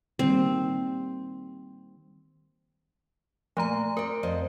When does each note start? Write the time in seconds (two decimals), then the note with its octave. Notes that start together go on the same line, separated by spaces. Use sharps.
0.19 D#3 G3 A#3 C4
3.57 A#2 F3 A3 A#3 A#5
3.97 C4 A#4 D5
4.23 F2 C5 D#5